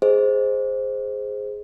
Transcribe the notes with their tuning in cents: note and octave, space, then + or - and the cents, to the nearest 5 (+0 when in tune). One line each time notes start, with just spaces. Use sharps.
G#4 +0 C5 +0 D#5 +0